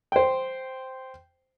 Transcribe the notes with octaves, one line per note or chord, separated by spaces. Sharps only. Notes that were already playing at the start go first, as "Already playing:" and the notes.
C5 G5